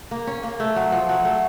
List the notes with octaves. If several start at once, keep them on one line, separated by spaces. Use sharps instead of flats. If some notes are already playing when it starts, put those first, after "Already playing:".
A#3
C#4
A#3
A3
F#3
F3
F#3
A3